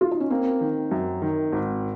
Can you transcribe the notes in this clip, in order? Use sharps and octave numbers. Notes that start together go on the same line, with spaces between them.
F4
D#4
C#4
A#3 C4
D#3
F#2
D#3
G#1